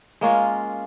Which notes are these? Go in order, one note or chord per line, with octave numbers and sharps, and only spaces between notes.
G#3 A#3 C#4 F4